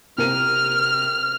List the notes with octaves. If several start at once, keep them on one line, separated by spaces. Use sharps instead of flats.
C3 A#4 F6 D#7